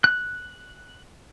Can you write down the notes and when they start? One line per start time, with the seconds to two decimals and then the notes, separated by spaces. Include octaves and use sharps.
0.04 F#6